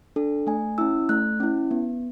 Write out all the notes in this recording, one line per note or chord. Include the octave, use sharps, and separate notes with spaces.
D4 A4
A3 G#5
C#4 E4 E6
A3 F#6
C#4 E4
B3